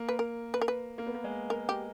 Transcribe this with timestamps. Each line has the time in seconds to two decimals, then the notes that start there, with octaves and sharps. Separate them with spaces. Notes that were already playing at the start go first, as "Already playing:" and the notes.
Already playing: A#3
0.09 B4
0.19 A#4
0.54 B4
0.62 A#4
0.68 B4
0.98 A#3
1.06 B3
1.14 A#3
1.24 G#3
1.50 A#3 A#4
1.69 G4